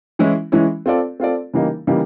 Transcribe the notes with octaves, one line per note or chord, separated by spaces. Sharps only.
E3 G#3 C#4 E4
E3 G#3 C#4 E4
C4 F4 A4 D5
C4 F4 A4 D5
C#3 E3 G3 A#3 D#4
C#3 E3 G3 A#3 D#4